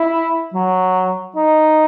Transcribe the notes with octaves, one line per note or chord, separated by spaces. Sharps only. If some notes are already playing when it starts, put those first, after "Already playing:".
Already playing: E4
F#3
D#4